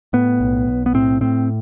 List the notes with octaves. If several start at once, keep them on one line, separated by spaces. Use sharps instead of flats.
A2 B3
B1
B1
B3
A2 C4
A2 C4